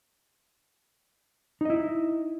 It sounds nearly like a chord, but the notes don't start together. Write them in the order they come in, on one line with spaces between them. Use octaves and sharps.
D#4 D#5 E4